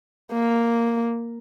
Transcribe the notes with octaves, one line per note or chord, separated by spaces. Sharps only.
A#3